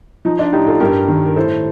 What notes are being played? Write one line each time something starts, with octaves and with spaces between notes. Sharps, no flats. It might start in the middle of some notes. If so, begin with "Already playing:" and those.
F3 D#4
D4 F4
A2 D#4 G4
F4 A4
G2 G4 A#4
D#3
A#4
A2 A4 C5